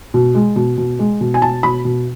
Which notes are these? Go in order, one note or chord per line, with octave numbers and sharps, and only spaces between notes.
B2
G#3
B2
B2
G#3
B2
G#5
B2 A5
B2 B5
B2